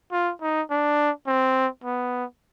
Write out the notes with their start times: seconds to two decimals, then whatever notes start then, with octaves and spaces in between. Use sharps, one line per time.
0.12 F4
0.41 D#4
0.70 D4
1.27 C4
1.84 B3